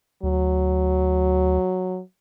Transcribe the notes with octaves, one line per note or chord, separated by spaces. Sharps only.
D2 F#3